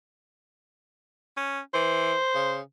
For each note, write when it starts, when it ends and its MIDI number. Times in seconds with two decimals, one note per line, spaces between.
1.37 1.60 61
1.74 2.15 52
1.74 2.58 72
2.35 2.61 49